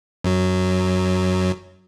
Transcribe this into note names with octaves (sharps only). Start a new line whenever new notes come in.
F#2 F#3